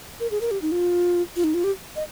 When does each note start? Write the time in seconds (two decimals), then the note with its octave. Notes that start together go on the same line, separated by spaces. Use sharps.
0.20 A#4
0.31 G#4
0.41 A#4
0.51 G4
0.62 D#4
0.72 F4
1.36 F4
1.44 D#4
1.54 F4
1.64 G4
1.96 D#5